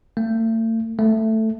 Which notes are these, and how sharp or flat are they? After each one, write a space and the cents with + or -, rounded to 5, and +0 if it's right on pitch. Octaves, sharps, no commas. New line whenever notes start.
A3 +40
A3 +5